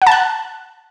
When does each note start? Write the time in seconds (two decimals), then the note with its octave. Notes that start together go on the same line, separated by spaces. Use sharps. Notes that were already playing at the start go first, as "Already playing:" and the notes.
0.02 F#5
0.07 A5
0.12 F#6